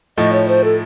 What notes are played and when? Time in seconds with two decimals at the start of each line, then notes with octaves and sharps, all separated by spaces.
0.17 A2 F3 A3 D#4 D#5
0.33 C#5
0.48 C5
0.64 A4